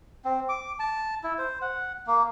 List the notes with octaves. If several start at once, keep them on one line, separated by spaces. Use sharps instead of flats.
C4
D6
A5
E4
C5
F#5
A#3